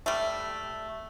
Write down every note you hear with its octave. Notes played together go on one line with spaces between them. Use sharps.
G3 A3